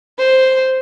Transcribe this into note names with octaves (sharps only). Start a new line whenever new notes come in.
C5